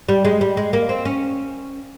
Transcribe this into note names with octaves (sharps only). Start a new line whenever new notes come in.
G3
G#3
G3
G#3
A#3
C4
C#4